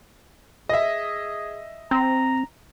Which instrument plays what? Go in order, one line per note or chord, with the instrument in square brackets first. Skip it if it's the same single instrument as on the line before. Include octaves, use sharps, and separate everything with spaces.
[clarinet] G#4 [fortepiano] D#5 E5
[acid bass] C4 [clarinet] A#5